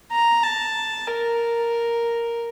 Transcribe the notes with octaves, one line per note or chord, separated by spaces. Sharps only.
A#5
A5
A#4